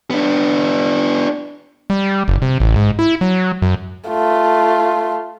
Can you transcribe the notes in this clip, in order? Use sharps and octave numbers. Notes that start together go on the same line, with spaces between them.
B3 D4
G3
F#1
C3
A1
G#2
E4
F#3
F#2
A3 F4